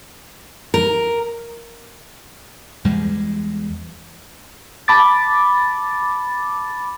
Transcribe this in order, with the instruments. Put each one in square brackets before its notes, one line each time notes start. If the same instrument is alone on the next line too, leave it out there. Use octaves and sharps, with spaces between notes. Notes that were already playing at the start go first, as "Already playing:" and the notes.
[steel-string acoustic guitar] A#4
[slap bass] E2 G3 G#3
[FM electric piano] A5 B5 D6 A6